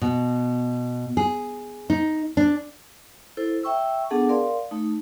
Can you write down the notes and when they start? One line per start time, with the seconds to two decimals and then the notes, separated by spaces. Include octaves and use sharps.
0.02 B2
1.17 G#4
1.90 D#4
2.37 D4
3.37 E4 A4 C5
3.63 E5 G5 C#6 E6
4.10 B3 D4 G#4 A4 F#5 A5
4.29 A#4 D5 F5 C6
4.71 A3 D#4